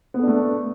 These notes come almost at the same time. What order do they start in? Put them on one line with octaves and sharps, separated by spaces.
B3 A4 D4 A3